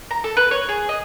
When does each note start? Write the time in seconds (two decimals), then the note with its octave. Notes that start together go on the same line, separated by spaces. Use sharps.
0.11 A#5
0.24 A4
0.37 B4
0.51 C#5
0.69 G#4
0.89 D#5